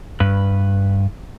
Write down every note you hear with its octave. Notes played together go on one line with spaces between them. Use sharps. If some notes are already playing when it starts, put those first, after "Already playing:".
G2 B4